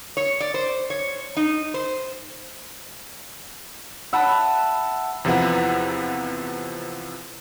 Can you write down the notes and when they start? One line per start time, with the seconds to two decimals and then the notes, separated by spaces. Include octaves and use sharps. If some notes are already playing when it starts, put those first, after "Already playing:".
0.17 C#5
0.40 D5
0.54 C5
0.90 C#5
1.37 D#4
1.74 C5
4.13 E5 F#5 A5 B5
5.25 E2 C3 F3 E4 B4 F#5